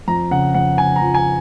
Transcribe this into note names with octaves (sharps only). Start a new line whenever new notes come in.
F2 A#5
C#3 F#5
F2 F#5
C#3 G#5
A#5
F3
G#5